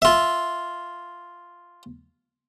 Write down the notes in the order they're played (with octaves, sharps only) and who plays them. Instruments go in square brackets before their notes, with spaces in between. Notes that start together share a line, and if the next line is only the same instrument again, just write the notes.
[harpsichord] F4 E5